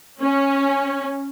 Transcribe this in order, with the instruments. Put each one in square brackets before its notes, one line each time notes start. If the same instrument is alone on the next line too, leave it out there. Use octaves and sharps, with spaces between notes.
[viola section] C#4